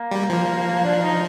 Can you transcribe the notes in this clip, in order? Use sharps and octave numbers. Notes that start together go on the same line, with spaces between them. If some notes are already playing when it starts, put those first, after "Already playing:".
Already playing: A#3
G3
F3
D4
D#4